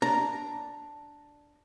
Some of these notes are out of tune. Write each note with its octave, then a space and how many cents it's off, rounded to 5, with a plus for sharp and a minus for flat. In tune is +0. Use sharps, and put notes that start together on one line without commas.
D4 +0 A#5 +0